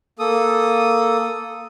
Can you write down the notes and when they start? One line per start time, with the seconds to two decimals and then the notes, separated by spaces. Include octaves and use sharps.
0.19 A#3 A4 D#6